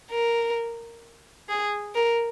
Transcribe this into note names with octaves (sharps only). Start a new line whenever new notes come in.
A#4
G#4
A#4